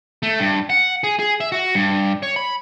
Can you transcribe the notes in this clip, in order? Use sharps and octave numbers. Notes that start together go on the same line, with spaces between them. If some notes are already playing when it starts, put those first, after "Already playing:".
A3
G2
F#5
G#4
G#4
E5
F#4
G2
C#5
B5